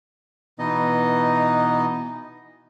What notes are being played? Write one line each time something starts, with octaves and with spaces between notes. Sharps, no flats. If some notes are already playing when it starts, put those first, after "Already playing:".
B2 E3 B3 D#4 D#5